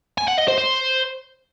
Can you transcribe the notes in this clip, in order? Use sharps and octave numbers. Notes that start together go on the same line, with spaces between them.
G#5
F#5
D#5
C5
C5